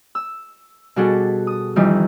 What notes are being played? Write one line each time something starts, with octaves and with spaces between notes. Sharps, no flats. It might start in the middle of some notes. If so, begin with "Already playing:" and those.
E6
B2 G3 D4 F#4 G#4 A4
D#6
F2 D#3 E3 G3 D#6